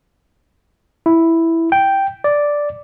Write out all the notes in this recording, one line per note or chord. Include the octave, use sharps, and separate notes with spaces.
E4
G5
D5